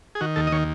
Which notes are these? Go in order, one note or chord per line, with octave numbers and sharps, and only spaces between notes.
G#4
D#3 F#4
D#2 A4
D#5
D#3 C#5